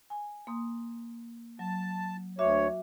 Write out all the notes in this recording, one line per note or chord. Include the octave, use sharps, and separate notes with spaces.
G#5
A#3 C6 D#6
F#3 A5
D2 F#4 C#5 E5 D6